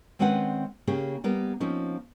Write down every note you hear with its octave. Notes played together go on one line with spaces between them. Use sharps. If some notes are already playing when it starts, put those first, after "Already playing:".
D#3 G#3 C4 C#4 B4 F#5
C#3 A#3 C#4 G4 G#4
G3 A#3 B3 A#4
F3 A#3 C4 C#4 D#4